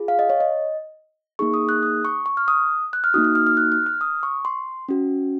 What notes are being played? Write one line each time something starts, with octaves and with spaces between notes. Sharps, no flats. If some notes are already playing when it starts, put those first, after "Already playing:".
Already playing: F4 G#4
F5
D#5
C#5
D#5
A#3 D#4 G#4 C#6
D#6
F#6
D#6
C#6
C#6
F6
D#6
F#6
F6
A#3 D#4 F#4 D#6
F6
F6
F6
F#6
F6
F6
D#6
C#6
C6
C#4 F#4